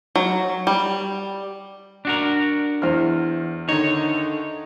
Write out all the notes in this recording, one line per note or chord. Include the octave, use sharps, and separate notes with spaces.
F#3
G3
D4 F#4 A#4
E2 C5 F6
D3 D#3 D#4 C#5